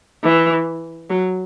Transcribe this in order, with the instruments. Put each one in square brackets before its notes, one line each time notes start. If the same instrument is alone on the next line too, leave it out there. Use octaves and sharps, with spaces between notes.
[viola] E3
F#3